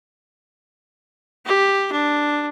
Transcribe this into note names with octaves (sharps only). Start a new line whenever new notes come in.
G4
D4